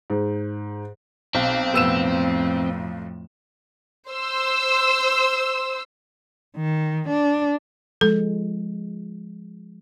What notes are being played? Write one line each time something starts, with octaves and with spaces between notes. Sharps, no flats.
G#2
B1 C4
F2 A2 B3 E6 E7
C5 E6
D#3
D4
F3 G#3 A4